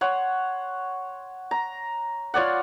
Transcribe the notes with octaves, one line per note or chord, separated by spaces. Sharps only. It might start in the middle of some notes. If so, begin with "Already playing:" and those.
C#5 F#5 C6
A#5
F4 C#5 D5 F#5